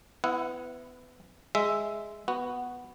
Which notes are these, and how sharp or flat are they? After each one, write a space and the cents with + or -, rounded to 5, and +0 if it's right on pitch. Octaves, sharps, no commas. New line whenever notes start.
B3 +25 E4 +10 F#5 -15
G#3 +0 E5 +0
B3 +0 F#4 +0